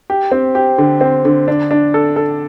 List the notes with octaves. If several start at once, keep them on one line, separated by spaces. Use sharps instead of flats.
G4
C4
G4
D3
C4
D3
D4
D4
A4
A4